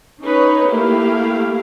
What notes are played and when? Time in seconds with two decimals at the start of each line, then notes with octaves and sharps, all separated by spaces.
0.24 C#4 D#4 B4 C#5
0.68 A3 A#3 E4 G4 F5